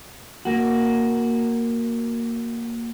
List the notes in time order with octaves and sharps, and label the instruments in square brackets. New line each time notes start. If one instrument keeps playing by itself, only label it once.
[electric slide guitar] A#3 F#4